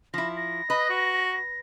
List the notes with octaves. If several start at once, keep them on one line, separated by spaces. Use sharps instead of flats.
F3 E4 A#6
A#6
B4 D#5
F#4